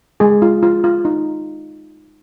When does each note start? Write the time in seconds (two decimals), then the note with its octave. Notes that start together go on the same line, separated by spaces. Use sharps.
0.20 G#3 G#4
0.42 F4
0.63 F4
0.84 F4
1.05 D#4